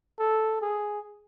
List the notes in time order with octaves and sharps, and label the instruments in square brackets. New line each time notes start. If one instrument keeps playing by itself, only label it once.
[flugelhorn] A4
G#4